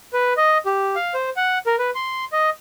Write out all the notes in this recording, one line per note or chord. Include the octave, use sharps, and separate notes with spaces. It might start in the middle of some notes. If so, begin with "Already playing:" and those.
B4
D#5
G4
F5
C5
F#5
A#4
B4
C6
D#5